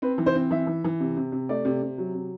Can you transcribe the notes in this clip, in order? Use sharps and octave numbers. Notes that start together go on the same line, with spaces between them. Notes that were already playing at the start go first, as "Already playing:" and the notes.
C4 B4
E3
C5
C4
E3 E5
E3
E3
C3
C3
C3
A3 D5
C3
C3
F#3
C3